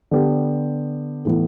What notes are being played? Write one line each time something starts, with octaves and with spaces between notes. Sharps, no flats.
D3 B3 G4
A2 E3 B3